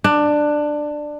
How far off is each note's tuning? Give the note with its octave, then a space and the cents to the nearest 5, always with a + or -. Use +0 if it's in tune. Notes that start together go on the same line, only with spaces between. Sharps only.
D4 +15